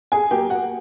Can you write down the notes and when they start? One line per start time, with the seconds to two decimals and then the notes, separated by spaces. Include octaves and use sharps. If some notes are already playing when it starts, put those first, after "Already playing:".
0.12 G#4 G#5
0.31 F#3 A#3 G4 G5
0.50 F#4 F#5